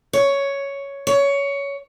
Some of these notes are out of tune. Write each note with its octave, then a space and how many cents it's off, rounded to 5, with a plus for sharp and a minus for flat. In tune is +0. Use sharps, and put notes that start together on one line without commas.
C#5 +5
C#5 +15